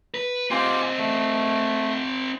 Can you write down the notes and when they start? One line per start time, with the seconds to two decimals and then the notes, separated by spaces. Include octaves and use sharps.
0.14 B4
0.51 C4 D#4 F4 G4 G#5
0.98 A3